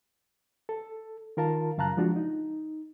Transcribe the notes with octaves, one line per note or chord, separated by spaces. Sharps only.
A4
D#3 F4 A#4 F5 A5
F#2 C#3 F5 A5 A#5 F#6
F3 G#3 D4 F4 F#4
D#4